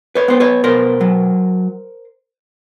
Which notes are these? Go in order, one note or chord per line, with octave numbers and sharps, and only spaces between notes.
B4 C#5
B3 C5
B4 C#5
B2 A#4 C5
F#3